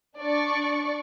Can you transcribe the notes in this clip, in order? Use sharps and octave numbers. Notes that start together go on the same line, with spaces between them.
D4 D5 C#6